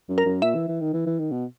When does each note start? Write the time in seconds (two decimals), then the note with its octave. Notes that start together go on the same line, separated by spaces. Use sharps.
0.09 F#2
0.18 A#4
0.26 F#2
0.42 A#2 E5
0.55 E3
0.68 E3
0.81 D#3
0.94 E3
1.06 E3
1.19 D#3
1.32 B2